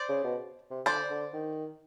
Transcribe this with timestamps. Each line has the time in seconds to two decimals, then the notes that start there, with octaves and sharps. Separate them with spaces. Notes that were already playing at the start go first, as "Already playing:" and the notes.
Already playing: C5 D5
0.09 C#3
0.24 B2
0.71 C3
0.86 D3 C5 D5
1.10 D3
1.33 D#3